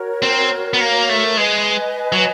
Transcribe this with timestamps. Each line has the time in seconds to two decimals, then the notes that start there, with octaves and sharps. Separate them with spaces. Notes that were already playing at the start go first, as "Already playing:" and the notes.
Already playing: F#4 A#4 C#5
0.22 C4
0.74 B3
0.81 A#3
1.09 A3
1.37 G#3 B4 D#5 G#5
2.12 F#3